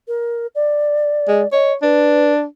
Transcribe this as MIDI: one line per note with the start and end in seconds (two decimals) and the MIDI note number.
0.08 0.47 70
0.55 1.47 74
1.28 1.43 56
1.52 1.75 73
1.52 1.73 75
1.82 2.44 62
1.82 2.32 71